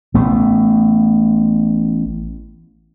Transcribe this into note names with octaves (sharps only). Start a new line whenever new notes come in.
A1 A3 B3